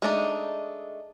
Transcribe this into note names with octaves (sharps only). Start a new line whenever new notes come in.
G#3 A3 D4 D#4